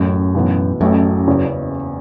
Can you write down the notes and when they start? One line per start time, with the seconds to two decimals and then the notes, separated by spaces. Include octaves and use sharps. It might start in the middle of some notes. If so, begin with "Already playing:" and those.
Already playing: A1 F#2 A2 A3
0.35 B1 A2 E3 B3
0.81 A1 F#2 A2 A3
1.27 F#1 E2 C#3 E3 C#4